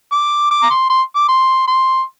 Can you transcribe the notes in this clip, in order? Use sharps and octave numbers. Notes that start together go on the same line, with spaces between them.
D6
D6
A#5
C6
C6
D6
C6
C6